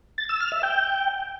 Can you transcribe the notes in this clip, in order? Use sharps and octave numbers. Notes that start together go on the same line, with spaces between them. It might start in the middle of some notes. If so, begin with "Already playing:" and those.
A6
E6
F6
E5
G5